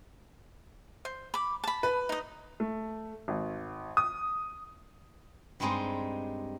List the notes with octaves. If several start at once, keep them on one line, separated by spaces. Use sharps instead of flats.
C5
B5 D6
A5 B5
B4
D#4 D#5
A3
G#1
D#6
G2 G3 G#3 C4 D#4